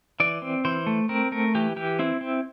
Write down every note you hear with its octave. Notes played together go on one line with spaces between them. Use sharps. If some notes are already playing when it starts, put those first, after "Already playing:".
E3 D5
C4
E3 C5
A3
C4 A#4
A3 A#4
E3 G4
E3 G4
C4 E4
C4